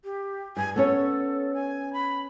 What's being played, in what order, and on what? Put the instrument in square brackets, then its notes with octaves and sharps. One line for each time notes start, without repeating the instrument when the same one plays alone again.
[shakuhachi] G4
[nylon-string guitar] G2 [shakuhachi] G#5
[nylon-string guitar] B3 C#4 C#5 [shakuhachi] A4
[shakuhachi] G#5
B5